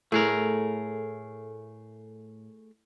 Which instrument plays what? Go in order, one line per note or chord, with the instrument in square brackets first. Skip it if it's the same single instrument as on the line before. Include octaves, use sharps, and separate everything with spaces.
[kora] A2 [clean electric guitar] A3 G#4 A#4